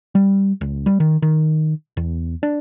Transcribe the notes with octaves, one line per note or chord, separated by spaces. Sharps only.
G3
C#2
G3
D#3
D#3
E2
D4